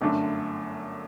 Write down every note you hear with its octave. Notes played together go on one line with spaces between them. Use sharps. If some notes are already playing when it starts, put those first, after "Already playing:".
G1 F#2 D3 A3 D4